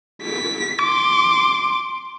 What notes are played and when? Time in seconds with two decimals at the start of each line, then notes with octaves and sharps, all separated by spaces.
0.22 B6
0.81 C6 D6